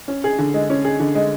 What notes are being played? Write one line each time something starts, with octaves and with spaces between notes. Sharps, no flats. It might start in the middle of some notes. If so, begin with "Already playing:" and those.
C#4
G#4
D3
G#3
C#4
G#4
D3
G#3